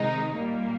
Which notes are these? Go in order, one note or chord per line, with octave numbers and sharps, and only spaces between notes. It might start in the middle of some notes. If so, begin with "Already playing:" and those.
Already playing: C3 D#3 G#3 D#4
A#2 G3 A#3